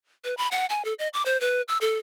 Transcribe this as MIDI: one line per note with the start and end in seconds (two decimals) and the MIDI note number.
0.24 0.34 71
0.37 0.48 83
0.51 0.66 78
0.69 0.82 80
0.85 0.94 69
0.99 1.08 75
1.14 1.23 86
1.26 1.39 72
1.41 1.62 71
1.68 1.78 88
1.81 1.98 69